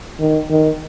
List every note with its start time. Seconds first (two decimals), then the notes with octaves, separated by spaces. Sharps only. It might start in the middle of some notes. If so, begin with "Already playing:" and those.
0.19 D#3
0.50 D#3